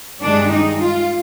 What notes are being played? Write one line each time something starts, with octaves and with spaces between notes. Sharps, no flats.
G2 D#3 G#3 D4
D#4
F4